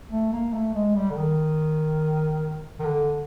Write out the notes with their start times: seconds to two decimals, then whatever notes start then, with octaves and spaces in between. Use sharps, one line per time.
0.11 A3
0.33 A#3
0.53 A3
0.74 G#3
0.96 G3
1.10 D3
1.16 D#3
2.80 D#3
2.84 D3